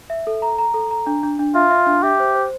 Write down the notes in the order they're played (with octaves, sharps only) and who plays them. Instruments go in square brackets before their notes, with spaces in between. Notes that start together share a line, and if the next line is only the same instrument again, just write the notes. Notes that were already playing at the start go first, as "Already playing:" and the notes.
[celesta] E5
A4
A#5
A#5
A4
A#5
D4
D4
D4
[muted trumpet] F4 [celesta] E5
[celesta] E5
D4
[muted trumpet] G4 [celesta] E5
[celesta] C5
C5